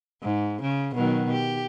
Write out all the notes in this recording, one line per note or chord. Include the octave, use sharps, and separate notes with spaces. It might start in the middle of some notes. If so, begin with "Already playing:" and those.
G#2
C#3
B2 D#3 F#3
G4